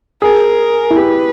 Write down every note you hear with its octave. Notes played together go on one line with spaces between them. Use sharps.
G#4 A#4
E4
G4 B4